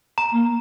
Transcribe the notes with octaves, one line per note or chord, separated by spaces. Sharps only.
A#5
A#3